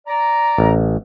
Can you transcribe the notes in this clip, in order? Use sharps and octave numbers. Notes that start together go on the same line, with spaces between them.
D5 A#5
A1